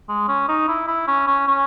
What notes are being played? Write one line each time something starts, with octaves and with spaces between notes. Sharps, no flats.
G#3
C#4
D#4
E4
E4
C#4
C#4
C#4